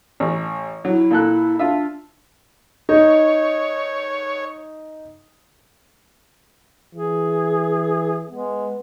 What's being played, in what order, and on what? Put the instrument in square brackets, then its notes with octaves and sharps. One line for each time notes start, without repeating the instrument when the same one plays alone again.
[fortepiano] A1
[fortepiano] F#3 [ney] E4
[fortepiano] A#2 A4 F#6
[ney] D4 [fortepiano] F4 E5
[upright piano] D#4 [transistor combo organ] C#5
[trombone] E3 [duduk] G#4
[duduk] G#3 [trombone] B3